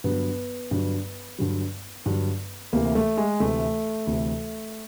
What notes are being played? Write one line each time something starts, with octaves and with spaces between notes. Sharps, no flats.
G2 D3 F#3 B3
G2 D3 F#3
G2 D3 F#3
G2 D3 F#3
D2 C3 E3 A#3
A3
G#3
D2 C3 E3 A3
D2 C3 E3